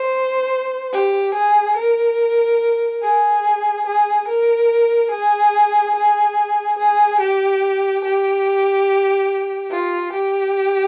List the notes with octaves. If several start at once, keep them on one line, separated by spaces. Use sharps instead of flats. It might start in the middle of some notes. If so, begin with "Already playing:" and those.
Already playing: C5
G4
G#4
A#4
G#4
G#4
A#4
G#4
G#4
G#4
G4
G4
F4
G4